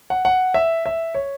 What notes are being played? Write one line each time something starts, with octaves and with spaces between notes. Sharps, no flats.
F#5
F#5
E5
E5
C#5